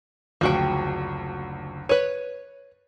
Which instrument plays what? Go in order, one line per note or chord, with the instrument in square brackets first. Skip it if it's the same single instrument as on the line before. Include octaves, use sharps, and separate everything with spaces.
[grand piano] F#1 D2 [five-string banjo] F3 F#4 G5
[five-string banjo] B4 C#5 [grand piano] D#7